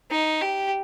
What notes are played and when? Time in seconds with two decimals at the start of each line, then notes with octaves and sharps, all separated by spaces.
0.11 D#4
0.42 G4